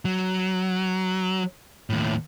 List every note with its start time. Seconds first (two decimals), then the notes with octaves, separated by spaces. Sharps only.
0.05 F#3
1.90 D#2 A2